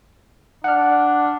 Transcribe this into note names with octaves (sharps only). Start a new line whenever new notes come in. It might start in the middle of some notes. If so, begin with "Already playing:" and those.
D4 F#5 F6